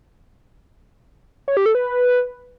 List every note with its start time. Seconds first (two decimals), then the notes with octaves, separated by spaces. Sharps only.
1.48 C#5
1.57 G4
1.66 A4
1.75 B4